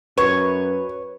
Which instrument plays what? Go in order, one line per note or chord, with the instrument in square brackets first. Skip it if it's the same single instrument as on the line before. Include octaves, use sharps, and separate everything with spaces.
[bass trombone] F#2 [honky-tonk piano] B4 [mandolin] C#5